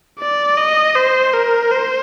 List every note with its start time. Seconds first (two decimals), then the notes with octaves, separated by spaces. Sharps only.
0.20 D5
0.57 D#5
0.95 C5
1.33 A#4
1.71 C5